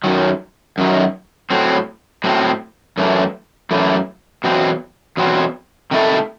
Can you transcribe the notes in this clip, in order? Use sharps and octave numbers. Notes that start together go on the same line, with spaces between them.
F#2 D#3 F#3
F#2 D#3 F#3
A2 F#3 C4
A2 F#3 C4
F#2 E3 A3
F#2 E3 A3
E2 B2 F#3 C4
E2 B2 F#3 C4
C3 D#3 A3 E4 A4